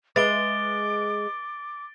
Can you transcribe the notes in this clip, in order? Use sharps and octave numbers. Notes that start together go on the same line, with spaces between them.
G#3 B4 E5 D6 A6 D7 G7